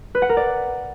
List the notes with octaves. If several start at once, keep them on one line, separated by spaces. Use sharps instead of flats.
B4
F#5
A#4
D5